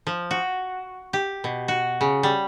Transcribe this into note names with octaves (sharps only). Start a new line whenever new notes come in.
F3
F#4
G4
B2
F#4
C#3
G3